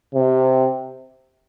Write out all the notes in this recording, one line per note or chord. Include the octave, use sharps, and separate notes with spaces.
C3